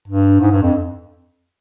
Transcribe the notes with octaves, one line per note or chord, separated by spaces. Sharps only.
G2
G#2
G2
F2